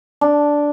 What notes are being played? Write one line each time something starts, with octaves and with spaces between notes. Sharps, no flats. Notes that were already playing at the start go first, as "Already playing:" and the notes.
D4